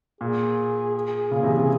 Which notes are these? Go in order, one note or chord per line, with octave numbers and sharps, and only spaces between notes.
A#2 G#4
G#4
A#2 C#3
C3 E3
C3